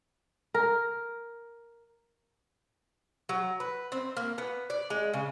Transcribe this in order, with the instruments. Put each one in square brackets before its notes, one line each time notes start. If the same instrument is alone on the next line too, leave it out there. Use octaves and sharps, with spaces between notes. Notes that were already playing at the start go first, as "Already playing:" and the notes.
[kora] A#4
[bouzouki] F#3
B4
C4
A#3
B3
D5
G#3
C#3